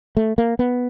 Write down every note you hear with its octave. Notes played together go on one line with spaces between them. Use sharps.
A3
A#3
B3